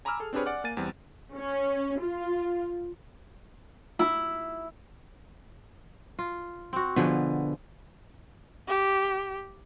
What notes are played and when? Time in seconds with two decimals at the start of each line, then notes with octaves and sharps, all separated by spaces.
0.05 G#5 A#5 B5 D6 E6 F6
0.20 G#4 A4
0.33 C4 D4 G4 G#4 B4 C#5
0.46 D5 F#5 G#5 D6 F#6
0.64 A#3 G#5 A6 D#7
0.77 E2 G3 C4
1.34 C#4
1.99 F4
3.99 E4
6.19 F4
6.73 C4 F#4
6.96 B2 D3 F3 B3 G#4
8.68 G4